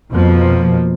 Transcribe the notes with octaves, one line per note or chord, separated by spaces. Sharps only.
F2 B2 F3 A#3